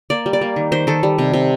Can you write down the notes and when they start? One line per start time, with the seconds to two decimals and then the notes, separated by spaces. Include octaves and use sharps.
0.10 A#3 D5
0.26 G3
0.33 D5
0.41 A#3
0.56 D#3
0.72 D#3 C5
0.87 D#3 A4
1.03 G3
1.18 C3
1.33 C3